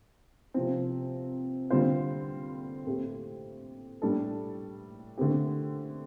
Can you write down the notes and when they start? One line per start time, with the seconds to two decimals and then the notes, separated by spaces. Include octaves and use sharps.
0.54 C3 F3 C4
1.70 D3 G3 C4 F4 C5
2.87 A2 A3 C4 G4
4.02 A2 G3 D4 A4
5.17 D3 A3 C4 G4